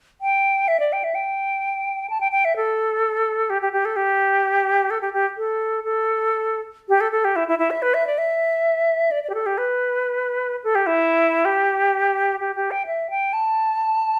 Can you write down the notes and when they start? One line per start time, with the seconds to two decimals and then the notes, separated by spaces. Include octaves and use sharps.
0.21 G5
0.68 E5
0.80 D5
0.93 G5
1.04 E5
1.15 G5
2.10 A5
2.21 G5
2.32 G5
2.45 E5
2.56 A4
3.50 G4
3.62 G4
3.73 G4
3.85 A4
3.96 G4
4.90 A4
5.01 G4
5.13 G4
5.37 A4
5.84 A4
6.89 G4
7.01 A4
7.12 A4
7.25 G4
7.36 E4
7.48 E4
7.59 E4
7.71 E5
7.82 B4
7.94 E5
8.07 D5
8.18 E5
9.11 D5
9.24 D5
9.30 G4
9.34 A4
9.46 G4
9.58 B4
10.64 A4
10.75 G4
10.87 E4
11.45 G4
12.40 G4
12.56 G4
12.71 G5
12.86 E5
13.10 G5
13.33 A5